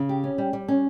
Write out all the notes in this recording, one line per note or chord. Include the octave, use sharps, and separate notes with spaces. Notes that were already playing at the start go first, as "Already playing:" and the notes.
Already playing: C#3
G4
C#4
G3
G3
C#4